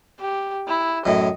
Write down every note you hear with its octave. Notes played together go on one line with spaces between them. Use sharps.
G4
E4
F#2 A2 D#5